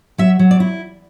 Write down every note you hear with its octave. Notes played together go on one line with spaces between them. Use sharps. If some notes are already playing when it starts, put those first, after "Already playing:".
F#3 E5
F#3
D5
E4